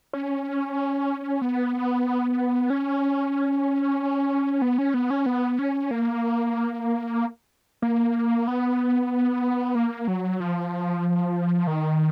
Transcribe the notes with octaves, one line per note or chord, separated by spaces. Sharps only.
C#4
B3
C#4
B3
C#4
B3
C#4
B3
C#4
A#3
A#3
B3
A#3
F#3
F3
D#3